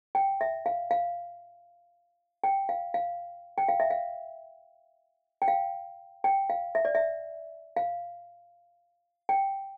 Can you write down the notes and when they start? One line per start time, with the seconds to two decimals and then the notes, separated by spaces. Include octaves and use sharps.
0.15 G5
0.41 E5
0.66 F5
0.91 F5
2.44 G5
2.69 F5
2.94 F5
3.58 G5
3.69 F5
3.80 E5
3.90 F5
5.42 G5
5.48 F5
6.24 G5
6.50 F5
6.75 E5
6.85 D5
6.95 E5
7.77 F5
9.29 G5